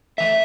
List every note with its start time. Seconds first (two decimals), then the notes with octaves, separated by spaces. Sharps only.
0.18 E3 A3 E5